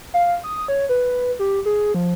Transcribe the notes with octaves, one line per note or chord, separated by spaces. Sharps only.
F5
D#6
C#5
B4
G4
G#4
F3